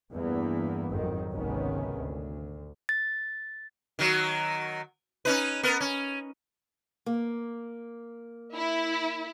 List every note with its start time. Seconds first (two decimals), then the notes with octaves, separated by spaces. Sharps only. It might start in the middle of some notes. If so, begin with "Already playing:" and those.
0.13 E2 G2 E3 A#3 B3
0.90 G#1 F2 D#3 F#3
1.31 G#1 C#2 C3 D#3 B3 C#4
1.98 D2
2.89 A6
3.99 D#3 F#3
5.25 C#4 D#4 B4
5.63 B3 A#4
5.81 C#4
7.06 A#3
8.54 E4